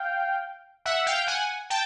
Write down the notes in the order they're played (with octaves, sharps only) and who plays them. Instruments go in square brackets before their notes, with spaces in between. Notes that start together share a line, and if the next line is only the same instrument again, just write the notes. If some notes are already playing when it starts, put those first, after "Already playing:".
Already playing: [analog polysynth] F5 G5
E5 F#5
F5 G5
F#5 G#5
G5 A5